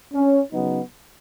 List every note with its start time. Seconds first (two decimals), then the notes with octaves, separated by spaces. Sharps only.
0.14 C#4
0.52 C#3 F#3 B3 D#4